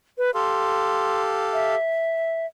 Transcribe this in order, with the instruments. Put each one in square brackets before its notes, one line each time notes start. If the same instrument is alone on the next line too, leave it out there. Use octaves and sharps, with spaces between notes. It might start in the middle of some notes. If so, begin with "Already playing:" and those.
[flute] B4
[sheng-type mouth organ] G4 A4 F5 [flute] C6
[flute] E5